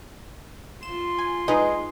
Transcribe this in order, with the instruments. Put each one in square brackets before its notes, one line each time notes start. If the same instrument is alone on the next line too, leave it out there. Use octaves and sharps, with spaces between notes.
[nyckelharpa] F4 C6 [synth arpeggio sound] E7
[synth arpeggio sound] G#5
[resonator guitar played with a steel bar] G#3 [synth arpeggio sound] D#4 B4 D#5